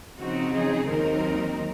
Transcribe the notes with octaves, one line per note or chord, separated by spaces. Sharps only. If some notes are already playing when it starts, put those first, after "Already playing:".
C#3 F3 C4 D#4 F#4
G#4
D#2 D#3 F#3 C4 D#4 A#4